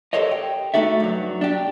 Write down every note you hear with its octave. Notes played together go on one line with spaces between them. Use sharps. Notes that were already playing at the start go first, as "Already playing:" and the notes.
G4 A4 A#4 C5 C#5 D#5
G5
A3 D#4 F#4 A4 E5
G2 F#3
D4 G4